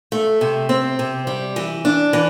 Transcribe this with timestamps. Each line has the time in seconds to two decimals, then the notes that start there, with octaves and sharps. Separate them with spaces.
0.12 A3
0.41 C3
0.69 C4
0.99 C3
1.27 G3
1.56 E3
1.85 D4
2.13 E3